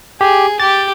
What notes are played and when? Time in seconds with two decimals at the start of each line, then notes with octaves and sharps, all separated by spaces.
0.21 G4 G#4
0.60 G4 A6